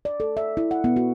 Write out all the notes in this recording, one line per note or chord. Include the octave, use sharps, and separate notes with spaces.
D5
A4
E5
E4
F#5
B3
F#4